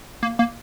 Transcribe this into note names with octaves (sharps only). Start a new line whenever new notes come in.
A#3
A#3